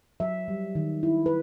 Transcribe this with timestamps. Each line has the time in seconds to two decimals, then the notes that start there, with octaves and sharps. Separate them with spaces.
0.20 F#3 E5
0.48 G3
0.75 D#3
1.03 E4
1.26 B4